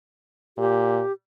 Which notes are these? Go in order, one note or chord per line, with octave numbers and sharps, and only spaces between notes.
A#2 G4